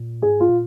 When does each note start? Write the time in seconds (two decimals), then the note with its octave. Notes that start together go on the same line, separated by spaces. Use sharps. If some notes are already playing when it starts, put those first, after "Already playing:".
Already playing: A#2
0.22 G#2 G#4
0.40 F4
0.49 A#2